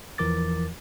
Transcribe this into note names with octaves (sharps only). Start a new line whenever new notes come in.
E2 E3 F3 A#4 D6 A6